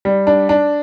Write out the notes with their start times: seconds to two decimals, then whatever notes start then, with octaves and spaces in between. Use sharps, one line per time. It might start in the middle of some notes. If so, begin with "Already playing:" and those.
0.05 G3
0.27 D4
0.49 D4